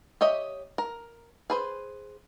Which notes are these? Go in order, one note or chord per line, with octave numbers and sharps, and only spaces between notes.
G4 C#5 D#5 E5
A#4
G#4 B4 C5